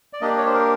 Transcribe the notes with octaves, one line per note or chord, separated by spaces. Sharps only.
D5
A#3 D4 G4 D#5
C#5
C5
A#4